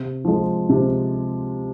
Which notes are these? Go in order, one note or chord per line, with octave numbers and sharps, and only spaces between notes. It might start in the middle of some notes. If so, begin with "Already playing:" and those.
Already playing: C3
F3 G#3
C3